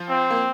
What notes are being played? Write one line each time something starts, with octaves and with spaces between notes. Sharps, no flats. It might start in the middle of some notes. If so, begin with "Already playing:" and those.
Already playing: F3
C4
A#3